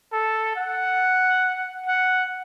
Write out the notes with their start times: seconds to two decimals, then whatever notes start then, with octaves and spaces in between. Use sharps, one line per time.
0.12 A4
0.56 F#5
1.86 F#5